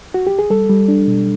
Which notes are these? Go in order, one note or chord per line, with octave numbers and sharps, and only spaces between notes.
F#4
G4
G#4
G3 A4
G3
D4
B2